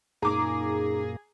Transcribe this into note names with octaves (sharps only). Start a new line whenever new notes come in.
F#2 A#2 A#3 D#4 G#4 A#5 D6